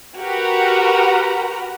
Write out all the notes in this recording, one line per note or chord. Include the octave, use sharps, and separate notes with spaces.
F#4 G4 A#4 B4 F#5 A#5